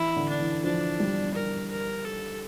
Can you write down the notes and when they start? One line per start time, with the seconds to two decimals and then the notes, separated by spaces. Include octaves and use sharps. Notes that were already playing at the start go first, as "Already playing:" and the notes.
Already playing: E3 E4
0.16 D3
0.29 D4
0.40 E3
0.64 F3 D4
1.00 G3
1.34 A#4
1.70 A#4
2.05 A4